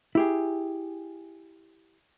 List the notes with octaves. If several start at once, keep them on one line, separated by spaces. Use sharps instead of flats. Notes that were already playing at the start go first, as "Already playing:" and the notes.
E4 G4 G#4